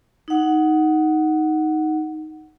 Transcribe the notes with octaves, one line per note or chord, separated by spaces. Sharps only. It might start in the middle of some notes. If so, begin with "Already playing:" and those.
D#4 F#5